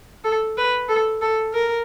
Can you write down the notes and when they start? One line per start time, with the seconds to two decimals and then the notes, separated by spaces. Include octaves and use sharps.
0.24 A4
0.58 B4
0.89 A4
1.22 A4
1.54 A#4